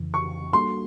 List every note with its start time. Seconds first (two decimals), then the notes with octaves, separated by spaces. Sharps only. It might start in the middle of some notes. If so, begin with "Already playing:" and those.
Already playing: F2 C#3 E3
0.14 C#6
0.53 G3 A#3 D4 F#4 A4 C6